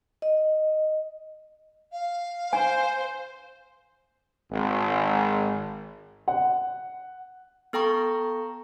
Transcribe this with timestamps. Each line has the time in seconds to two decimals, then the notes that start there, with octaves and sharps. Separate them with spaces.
0.22 D#5
1.92 F5
2.53 C5 G#5
4.52 G#1
6.28 F#5
7.73 B3 A4 G5 A#5 C#6